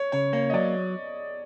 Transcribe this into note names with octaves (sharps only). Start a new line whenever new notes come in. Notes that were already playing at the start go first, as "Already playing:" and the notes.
Already playing: C#5
C#3 C#5
A#3 C#5
D#5
F#3 D5